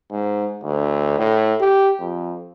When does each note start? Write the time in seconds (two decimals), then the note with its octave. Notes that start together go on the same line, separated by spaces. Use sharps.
0.11 G#2
0.64 D2
1.18 A2
1.60 G4
2.00 F2